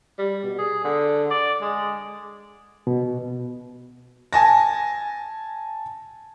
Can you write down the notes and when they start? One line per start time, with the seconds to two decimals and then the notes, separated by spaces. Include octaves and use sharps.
0.19 G3
0.43 B2
0.58 G#4
0.84 D3
1.31 D5
1.61 G#3
2.87 B2
4.33 G#5 A5 A#6